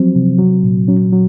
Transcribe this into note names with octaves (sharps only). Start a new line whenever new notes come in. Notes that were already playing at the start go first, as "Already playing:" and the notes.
Already playing: F3 F#3 C4
C3
F#3
A#2
F#3 C#4
F#3